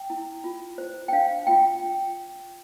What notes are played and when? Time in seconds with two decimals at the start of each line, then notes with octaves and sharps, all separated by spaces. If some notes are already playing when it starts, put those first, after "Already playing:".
Already playing: G5
0.10 E4
0.44 F4
0.78 C5
1.08 G5
1.12 D4 F5
1.47 F4 G5